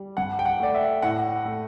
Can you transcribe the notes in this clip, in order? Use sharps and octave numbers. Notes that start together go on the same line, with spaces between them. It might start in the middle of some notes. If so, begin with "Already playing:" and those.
Already playing: G3
G2 F#5
G5
F#5
A3 D5
E5
A2 F#5
A3